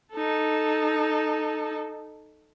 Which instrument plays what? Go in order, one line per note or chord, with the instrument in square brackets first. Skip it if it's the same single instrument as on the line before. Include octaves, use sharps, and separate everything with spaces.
[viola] D#4 A4